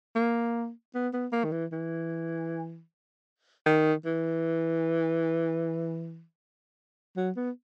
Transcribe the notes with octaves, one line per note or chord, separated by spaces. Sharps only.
A#3
B3
B3
A#3
D#3
E3
E3
D#3
E3
F#3
B3